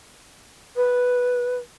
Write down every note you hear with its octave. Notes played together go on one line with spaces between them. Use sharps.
B4